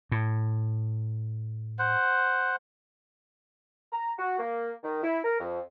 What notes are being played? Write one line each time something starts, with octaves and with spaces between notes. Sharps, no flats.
A2
C5 F#5
A#5
F#4
A#3
D#3
E4
A#4
F2